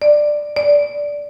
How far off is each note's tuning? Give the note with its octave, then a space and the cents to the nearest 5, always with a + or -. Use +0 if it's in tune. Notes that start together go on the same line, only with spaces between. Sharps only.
D5 +10
D5 -10